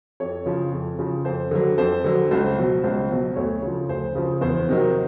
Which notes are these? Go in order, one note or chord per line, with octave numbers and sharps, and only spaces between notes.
F2 C#5
C#3 F3
F2
C#3 F3
F2 C5
D3 F#3
F2 C5
D3 F#3
C#2 C5
B2 F#3
C#2 C5
B2 F#3
D2 C#5
C#3 F3
D2 C5
C#3 F3
E2 C5
C3 D#3 F#3